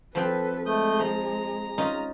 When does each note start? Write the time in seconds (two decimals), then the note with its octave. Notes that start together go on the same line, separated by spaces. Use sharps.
0.15 F3 C4 A4 B4 G5
0.66 G#3 A3 D#6 G6
0.99 F3 A#5
1.78 C#4 D#4 F4